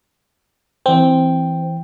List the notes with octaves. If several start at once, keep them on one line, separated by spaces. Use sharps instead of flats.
E3 C4 G5